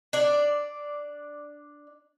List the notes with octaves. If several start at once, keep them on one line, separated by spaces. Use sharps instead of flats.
D4 D5